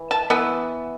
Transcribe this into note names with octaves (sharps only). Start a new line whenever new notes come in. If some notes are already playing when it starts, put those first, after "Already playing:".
Already playing: E3
A5
E3 B3